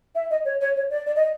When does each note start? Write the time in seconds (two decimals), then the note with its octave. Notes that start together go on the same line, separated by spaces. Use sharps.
0.15 E5
0.31 D#5
0.45 C#5
0.61 C#5
0.76 C#5
0.90 D5
1.06 D5
1.16 D#5